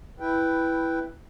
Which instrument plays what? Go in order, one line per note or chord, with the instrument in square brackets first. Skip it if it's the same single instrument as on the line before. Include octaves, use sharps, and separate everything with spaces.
[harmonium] E4 B4 G5